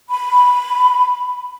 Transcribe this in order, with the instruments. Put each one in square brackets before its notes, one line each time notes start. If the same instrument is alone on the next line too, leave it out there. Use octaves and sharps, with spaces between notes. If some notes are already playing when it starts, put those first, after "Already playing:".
[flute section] B5